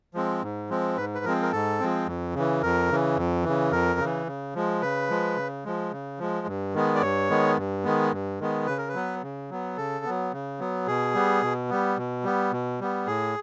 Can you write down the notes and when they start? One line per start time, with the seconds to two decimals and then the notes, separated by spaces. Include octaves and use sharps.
0.14 F3 G#3 C4
0.43 G#2
0.70 F3 G#3 C4
0.97 G#2 B4
1.15 B4
1.25 F3 G#3 C4 A#4
1.42 A#4
1.52 G#2 A4
1.80 F3 G#3 C4
2.07 F2
2.34 C#3 E3
2.63 F2 A#4
2.90 C#3 E3
3.17 F2
3.44 C#3 E3
3.72 F2 A#4
4.00 C#3 E3
4.27 C#3
4.55 F3 G#3
4.82 C#3 B4
5.10 F3 G#3
5.37 C#3
5.65 F3 G#3
5.92 C#3
6.19 F3 G#3
6.47 G2
6.74 D#3 G#3 B3
6.95 D5
7.02 G2 C#5
7.30 D#3 G#3 B3
7.57 G2
7.84 D#3 G#3 B3
8.12 G2
8.40 D#3 G#3 B3
8.67 C#3 B4
8.78 A#4
8.89 B4
8.95 F#3 B3
9.23 C#3
9.50 F#3 B3
9.77 C#3 A4
10.05 F#3 B3
10.33 C#3
10.60 F#3 B3
10.87 B2 G#4
11.14 G3 B3
11.43 B2
11.69 G3 B3
11.97 B2
12.24 G3 B3
12.52 B2
12.80 G3 B3
13.07 A2 G#4